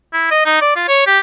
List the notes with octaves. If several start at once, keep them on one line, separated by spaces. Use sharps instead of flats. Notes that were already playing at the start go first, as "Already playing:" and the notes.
E4
D#5
D#4
D5
F4
C#5
G4